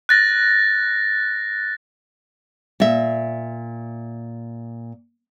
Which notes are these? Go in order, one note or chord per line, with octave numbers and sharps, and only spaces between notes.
F#6 A6 A#6
A#2 E5